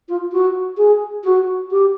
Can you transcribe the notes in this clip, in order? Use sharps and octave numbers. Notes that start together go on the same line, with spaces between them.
F4
F#4
G#4
F#4
G4